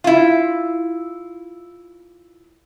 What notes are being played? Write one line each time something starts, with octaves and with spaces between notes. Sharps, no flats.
E4 F4